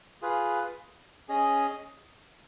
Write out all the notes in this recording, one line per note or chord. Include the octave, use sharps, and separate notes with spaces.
F4 G#4 B4
C#4 G#4 D#5